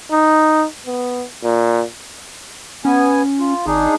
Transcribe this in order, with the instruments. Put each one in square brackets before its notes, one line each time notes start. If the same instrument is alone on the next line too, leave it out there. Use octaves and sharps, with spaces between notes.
[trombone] D#4
B3
A#2
[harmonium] B3 G#5 [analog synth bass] C#4
[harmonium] F4
[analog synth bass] G#1 [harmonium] D4 D#4 G#4